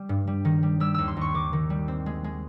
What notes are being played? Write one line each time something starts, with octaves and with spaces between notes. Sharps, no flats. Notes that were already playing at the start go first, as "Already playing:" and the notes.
Already playing: G3
G2
G3
D#3
G3
G3 E6
D#2 E6
C6
D#2 C#6
D#3 D6
D#3
G3
C4
G#3
G#3